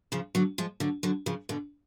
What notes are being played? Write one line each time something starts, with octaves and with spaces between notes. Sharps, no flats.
C#3 F3
D3 F#3
F3 G#3
D3 F#3
D3 F#3
C#3 F3
B2 D3